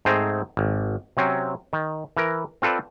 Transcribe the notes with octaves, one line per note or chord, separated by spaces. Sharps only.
G#2 A3 C4 G#4 C5 A#5
G#1
C3 F#3 C4 C#4
D#3
E3 A#4
C4 F4 A4 B4 D5